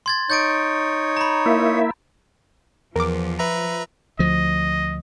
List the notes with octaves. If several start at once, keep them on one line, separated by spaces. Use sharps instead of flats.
C6 G#6 A6
D#4 C#5 G6 A6 D7
A#5 B5
A#3 E4 E5
E2 F3 A#4 D6
B4 E5 A#5
D2 F3 D#5